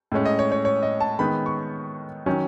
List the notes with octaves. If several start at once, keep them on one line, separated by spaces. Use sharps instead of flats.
A2 G#3 C#4
D#5
C#5
C#5
C#5
D#5
A5
D#3 G#3 B3 B5
C#6
D#3 F#3 C#4